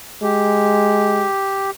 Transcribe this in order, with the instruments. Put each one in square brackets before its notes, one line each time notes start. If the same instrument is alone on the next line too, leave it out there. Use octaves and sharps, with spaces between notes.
[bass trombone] G#3 [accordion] G4